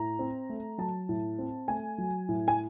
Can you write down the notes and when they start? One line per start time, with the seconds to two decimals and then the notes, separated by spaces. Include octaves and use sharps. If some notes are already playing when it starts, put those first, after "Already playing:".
Already playing: A2 A#5
0.19 C4
0.50 A3
0.78 F#3 A5
1.09 A2
1.39 C4
1.68 A3 G#5
1.98 F#3
2.29 A2
2.48 G#5